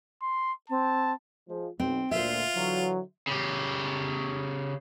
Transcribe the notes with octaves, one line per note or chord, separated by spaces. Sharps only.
C6
C4 A5
F3 G#3
B1 C4
D2 A#2 F4 C5 E5
D3 E3 F#3
C#3 G4